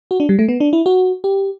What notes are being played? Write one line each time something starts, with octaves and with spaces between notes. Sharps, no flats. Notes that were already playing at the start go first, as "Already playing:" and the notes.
F#4
D4
G3
A3
B3
D4
E4
F#4
G4